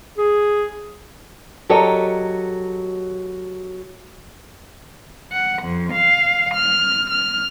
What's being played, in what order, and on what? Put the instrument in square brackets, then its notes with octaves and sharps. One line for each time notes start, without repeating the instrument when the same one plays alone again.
[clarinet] G#4
[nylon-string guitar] F#3 G4 A4 A#4 C#5 D#5
[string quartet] F#5
F2
F5
F6
F6